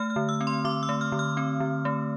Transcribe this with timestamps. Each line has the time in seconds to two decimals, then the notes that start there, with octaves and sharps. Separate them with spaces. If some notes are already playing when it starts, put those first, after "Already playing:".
Already playing: A3 F6
0.10 F6
0.16 D3
0.29 E6
0.41 C4
0.47 C6
0.64 D3 D6
0.83 E6
0.89 A3
1.01 F6
1.12 D3
1.19 F6
1.37 C4
1.60 D3
1.85 A3